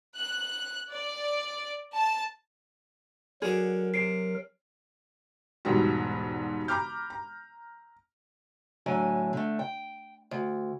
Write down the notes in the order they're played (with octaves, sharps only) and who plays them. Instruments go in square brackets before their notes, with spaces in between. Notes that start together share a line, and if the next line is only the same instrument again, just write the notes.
[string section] F#6
D5
A5
[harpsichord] D3 F#4 D6 [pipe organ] F#3 A#4 [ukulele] G#4
[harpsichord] C3 [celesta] C7 D7
[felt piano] E1 G#2 G3 F#4
A#5 B5 D6 F6 G6
A#5
[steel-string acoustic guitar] A2 D3 F#3 G#5
D3 A3
G5
D2